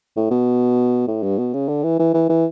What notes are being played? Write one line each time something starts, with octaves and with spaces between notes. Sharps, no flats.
A2
B2
A2
G2
B2
C#3
D3
E3
E3
E3
E3